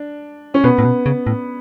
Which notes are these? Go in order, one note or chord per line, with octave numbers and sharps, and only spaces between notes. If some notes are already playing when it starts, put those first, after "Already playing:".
Already playing: D4
C#4
B2 B3
A2
B2
C#3
A2